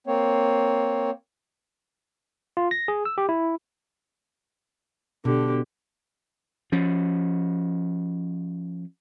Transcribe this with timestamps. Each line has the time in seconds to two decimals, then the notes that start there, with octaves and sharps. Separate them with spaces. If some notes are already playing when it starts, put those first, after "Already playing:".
0.07 A#3 C4 C#5
2.57 F4
2.71 A#6
2.88 G#4
3.05 E6
3.18 G4
3.29 E4
5.25 B2 D3 G4
6.72 F3 C#4